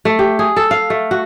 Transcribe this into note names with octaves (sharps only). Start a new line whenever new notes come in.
A3
G4
G#4
A4
F5
A3
F#4